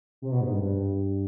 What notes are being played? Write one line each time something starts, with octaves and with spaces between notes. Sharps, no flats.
C3
B2
G#2
G2
G2